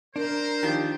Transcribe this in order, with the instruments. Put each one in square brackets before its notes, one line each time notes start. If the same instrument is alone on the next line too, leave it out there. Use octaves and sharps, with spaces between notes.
[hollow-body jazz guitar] D4 [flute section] A#4 [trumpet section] C5
[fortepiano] D#3 F3 G4